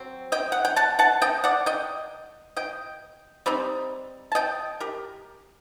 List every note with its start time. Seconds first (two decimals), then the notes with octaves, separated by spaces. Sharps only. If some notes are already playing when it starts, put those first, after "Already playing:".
Already playing: F#3 C4
0.32 D#5 G5
0.52 F#5
0.65 G5
0.76 F#5 A5
0.99 F#5 A5
1.22 D#5 G5
1.44 D5 F#5
1.66 D#5 G5
2.57 D#5 G5
3.46 G3 C4 D#4
4.32 A5
4.35 D#5 G5
4.80 G4 A#4